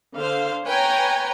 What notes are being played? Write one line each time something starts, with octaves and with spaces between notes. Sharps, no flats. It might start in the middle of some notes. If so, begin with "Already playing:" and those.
D3 C5 F5
B4 C#5 G5 G#5 A#5